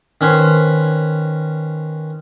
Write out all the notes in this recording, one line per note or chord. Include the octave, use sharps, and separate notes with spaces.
D#3 C#4 B4 C5